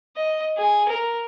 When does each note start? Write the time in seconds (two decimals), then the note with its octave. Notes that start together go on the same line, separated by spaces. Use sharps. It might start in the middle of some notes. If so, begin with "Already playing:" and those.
0.17 D#5
0.57 G#4
0.88 A#4